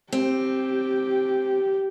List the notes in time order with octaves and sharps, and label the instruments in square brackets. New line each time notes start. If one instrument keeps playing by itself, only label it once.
[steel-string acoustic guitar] C4 [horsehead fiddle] G4